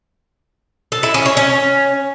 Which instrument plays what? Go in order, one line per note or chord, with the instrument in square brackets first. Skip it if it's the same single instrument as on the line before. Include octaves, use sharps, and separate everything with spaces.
[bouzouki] A4
E4
C#4
C#5
C#4